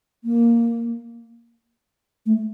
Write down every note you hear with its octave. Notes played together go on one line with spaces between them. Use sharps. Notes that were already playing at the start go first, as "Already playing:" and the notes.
A#3
A3